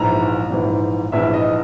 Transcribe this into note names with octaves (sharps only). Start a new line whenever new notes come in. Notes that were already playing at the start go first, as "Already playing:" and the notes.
Already playing: A#1 G#2 E3 A#5
A#1 G#2 E3
A#1 G#2 E3 E5
D#5